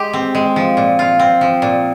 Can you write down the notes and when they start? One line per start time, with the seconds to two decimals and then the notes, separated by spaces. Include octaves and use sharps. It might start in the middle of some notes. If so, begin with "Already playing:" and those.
Already playing: G#3 G4
0.13 C4
0.35 G#3
0.56 F3
0.77 A#2
0.99 F4
1.19 C4
1.41 F3
1.62 A#2